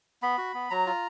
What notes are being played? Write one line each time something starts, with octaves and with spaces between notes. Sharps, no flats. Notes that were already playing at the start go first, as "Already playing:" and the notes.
B3 B5
F#4
B3
F#3 A#5
F4